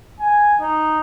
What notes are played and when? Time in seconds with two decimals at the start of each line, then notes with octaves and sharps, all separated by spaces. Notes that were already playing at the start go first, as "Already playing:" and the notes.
0.20 G#5
0.61 D#4